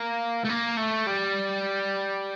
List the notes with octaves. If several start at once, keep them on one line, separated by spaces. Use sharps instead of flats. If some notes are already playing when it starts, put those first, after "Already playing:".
Already playing: A#3
A3
A#3
A3
G3